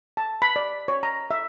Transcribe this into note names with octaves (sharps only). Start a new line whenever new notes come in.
A5
B5
D5
C#5
A#5
E5